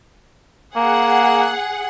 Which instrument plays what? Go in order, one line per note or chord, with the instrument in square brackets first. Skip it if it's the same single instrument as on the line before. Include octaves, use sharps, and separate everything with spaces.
[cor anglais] A#3 [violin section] G#4 F#5